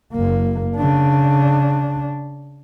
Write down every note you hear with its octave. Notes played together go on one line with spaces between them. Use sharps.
F#1 A#3
C#3 D4